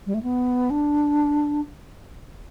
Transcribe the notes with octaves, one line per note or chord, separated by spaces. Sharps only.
G3
A3
B3
D4